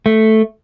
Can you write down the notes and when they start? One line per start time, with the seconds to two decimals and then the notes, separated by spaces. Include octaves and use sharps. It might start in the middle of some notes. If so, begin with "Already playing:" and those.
0.06 A3